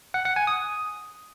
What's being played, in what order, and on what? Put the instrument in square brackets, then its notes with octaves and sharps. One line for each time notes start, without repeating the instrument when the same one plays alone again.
[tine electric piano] F#5
F#5
G#5
D#6